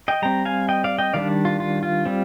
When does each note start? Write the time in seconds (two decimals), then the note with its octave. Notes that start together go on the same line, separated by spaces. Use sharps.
0.08 D#5 G5
0.22 G3 C4 G5 A#5
0.45 F5 G#5
0.69 D#5 G5
0.84 D5 F5
0.98 D#5 G5
1.13 D#3 G3 D4 D5 F5
1.45 F4
1.60 F4
1.83 F4
2.06 G3 C4